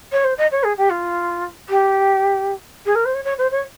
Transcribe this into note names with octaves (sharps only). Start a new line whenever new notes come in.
C#5
C5
D#5
C#5
G#4
G4
F4
G4
G#4
A#4
C5
C#5
C#5
C5
C#5